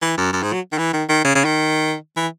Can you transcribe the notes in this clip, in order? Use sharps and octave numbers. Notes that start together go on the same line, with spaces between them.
E3
F#2
F#2
G#2
F#3
D#3
E3
D#3
D#3
C#3
C#3
D#3
E3